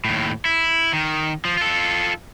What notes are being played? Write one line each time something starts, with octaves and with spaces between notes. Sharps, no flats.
D#2 A2
E4
D#3
F3
F4 A4